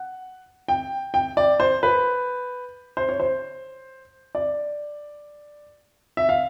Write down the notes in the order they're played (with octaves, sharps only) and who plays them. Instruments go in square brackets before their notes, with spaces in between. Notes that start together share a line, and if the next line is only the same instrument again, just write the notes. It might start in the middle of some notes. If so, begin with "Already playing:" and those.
Already playing: [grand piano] F#5
G5
G5
D5
C5
B4
C5
C#5
C5
D5
E5
F5